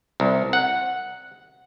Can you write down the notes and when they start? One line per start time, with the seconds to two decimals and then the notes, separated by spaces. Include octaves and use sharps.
0.20 C2
0.53 F#5